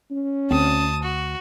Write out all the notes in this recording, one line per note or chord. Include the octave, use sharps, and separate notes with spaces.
C#4
D2 C4 A5 D#6
F#4